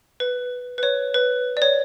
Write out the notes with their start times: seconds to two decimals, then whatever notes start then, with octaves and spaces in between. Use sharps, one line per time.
0.20 B4
0.78 B4
0.83 C#5
1.14 B4
1.57 D5
1.62 C#5